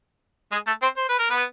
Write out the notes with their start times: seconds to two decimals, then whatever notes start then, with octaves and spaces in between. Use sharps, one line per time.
0.52 G#3 G#4
0.67 A3 A4
0.82 C4 C5
0.97 C5
1.09 B4
1.19 A#4
1.30 B3 B4